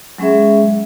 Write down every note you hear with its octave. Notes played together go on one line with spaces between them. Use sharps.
F#3 G#3 C#4 G#4 E5